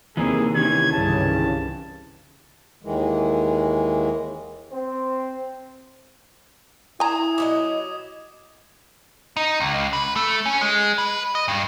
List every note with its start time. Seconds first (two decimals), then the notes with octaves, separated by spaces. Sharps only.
0.17 D#2 C3 E3 A#3 C4 G#4
0.55 D#3 E3 C#4 G#6
0.92 C2 G2 C#3 A5
2.83 D#2 D#3 E3 G#3
4.71 C4
7.00 E4 G#5 A#5 D#6 G#6 E7
7.38 B2 F#3 D#5 D6
9.37 D#4
9.60 C#2
9.93 B4
10.16 A3
10.46 C#4
10.61 G#3
10.98 B4
11.35 D#5
11.48 G2